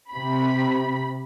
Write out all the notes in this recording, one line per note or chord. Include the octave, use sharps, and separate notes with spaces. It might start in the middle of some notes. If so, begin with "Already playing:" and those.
C3 B5